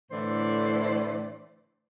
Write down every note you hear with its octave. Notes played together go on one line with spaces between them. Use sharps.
A2 D3 E3 C5 D5